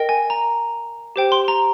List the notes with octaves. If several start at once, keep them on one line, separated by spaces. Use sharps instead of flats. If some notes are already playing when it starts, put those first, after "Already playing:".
Already playing: A#4 D#5 G5
G#5
A#5
G4 C5 G5
C6
A#5